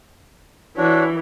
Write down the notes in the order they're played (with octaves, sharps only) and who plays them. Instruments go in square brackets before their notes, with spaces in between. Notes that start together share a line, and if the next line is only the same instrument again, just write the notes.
[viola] E3 [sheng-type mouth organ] D4 F#4 C#5